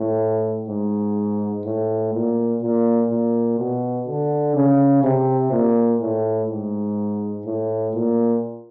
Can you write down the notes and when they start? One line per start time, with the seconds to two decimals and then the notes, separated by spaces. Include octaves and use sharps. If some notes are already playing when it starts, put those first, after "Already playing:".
Already playing: A2
0.68 G#2
1.66 A2
2.14 A#2
2.62 A#2
3.10 A#2
3.58 B2
4.07 D3
4.55 C#3
5.03 C3
5.51 A#2
6.00 A2
6.49 G#2
7.45 A2
7.94 A#2